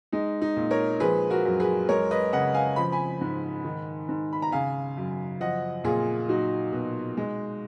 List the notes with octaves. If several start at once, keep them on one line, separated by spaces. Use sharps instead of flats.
G#3 D#4
D#4
A#2
A#4 C#5
F3 G#4 B4
F#4 A#4
F#2
G#4 B4
G#3 A#4 C#5
B4 D#5
C#3 D#5 F#5
F5 G#5
F3 B5
G#5 B5
G#2
D#3
G#2
B5
A#5
C#3 F5 G#5
F#2
F3 D#5 F#5
A#2 F4 G#4
F#3 D#4 F#4
B2
G#3